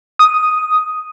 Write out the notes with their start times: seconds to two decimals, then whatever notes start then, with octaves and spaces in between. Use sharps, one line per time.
0.19 D#6